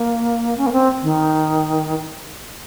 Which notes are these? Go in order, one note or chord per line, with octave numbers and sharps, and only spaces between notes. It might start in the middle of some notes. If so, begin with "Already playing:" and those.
Already playing: A#3
C#4
A#3
C4
D#3